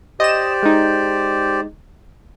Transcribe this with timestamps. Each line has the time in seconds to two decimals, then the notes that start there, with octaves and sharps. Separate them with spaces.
0.20 G4 C5 D5 D#5 E7
0.63 G#3 D#4